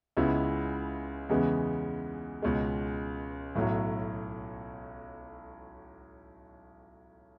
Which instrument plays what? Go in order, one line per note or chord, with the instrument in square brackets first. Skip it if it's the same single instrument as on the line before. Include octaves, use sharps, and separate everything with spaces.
[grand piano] C#2 C#3 G#3 B3 E4
E2 C#3 G#3 B3
C#2 B2 G#3
B1 A2 F#3